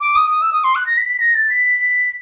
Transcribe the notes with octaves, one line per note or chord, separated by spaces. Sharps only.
D6
D#6
D#6
E6
D#6
C6
F#6
A#6
B6
B6
A#6
A6
B6